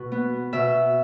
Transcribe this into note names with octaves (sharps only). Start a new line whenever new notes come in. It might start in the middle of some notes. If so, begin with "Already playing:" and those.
Already playing: B2 F#4
B3
B2 E5